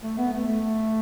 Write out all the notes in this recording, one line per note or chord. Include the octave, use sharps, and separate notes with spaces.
A3
B3
A3
A3